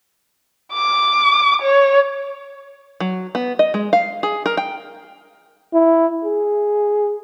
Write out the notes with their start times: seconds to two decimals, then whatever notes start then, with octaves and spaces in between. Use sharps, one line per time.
0.73 D6
1.62 C#5
3.00 F#3
3.35 B3
3.59 D#5
3.74 G#3
3.93 F5
4.23 G#4
4.46 A#4
4.57 G5
5.73 E4
6.25 G#4